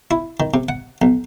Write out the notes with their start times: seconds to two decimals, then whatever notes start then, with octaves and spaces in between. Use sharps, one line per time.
0.11 E4
0.40 D#3
0.54 C3
0.69 F#5
1.02 B1